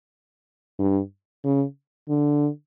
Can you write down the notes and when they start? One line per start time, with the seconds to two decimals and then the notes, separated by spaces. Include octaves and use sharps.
0.79 G2
1.44 C#3
2.09 D3